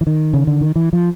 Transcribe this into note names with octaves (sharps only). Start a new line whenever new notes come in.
E3
D#3
C#3
D3
D#3
E3
F3